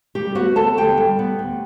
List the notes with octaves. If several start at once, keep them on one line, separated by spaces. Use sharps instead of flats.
G3 G4
B3 F#4 F#5
D2 A4 A5
D3 G4 G5
G3
B3
D2